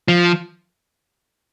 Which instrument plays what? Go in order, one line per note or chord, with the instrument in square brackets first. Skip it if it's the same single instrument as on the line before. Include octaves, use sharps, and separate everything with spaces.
[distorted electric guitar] F3